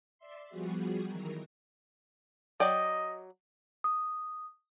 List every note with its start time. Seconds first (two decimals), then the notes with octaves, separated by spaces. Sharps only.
0.18 D5 E5 C6
0.49 F3 G3 B3 F#4 G#4
1.08 D#3 E3 F#3 A#4
2.60 F#3 D5 D#5 G5
3.84 D#6